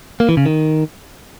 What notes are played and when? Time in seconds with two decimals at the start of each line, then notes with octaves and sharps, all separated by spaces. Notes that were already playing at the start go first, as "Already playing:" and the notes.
0.20 A#3
0.29 E3
0.37 C#3
0.46 D#3